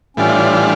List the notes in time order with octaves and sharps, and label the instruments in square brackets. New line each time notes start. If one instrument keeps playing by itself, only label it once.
[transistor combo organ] A2 E3 G3 D4 F4 [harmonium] C#4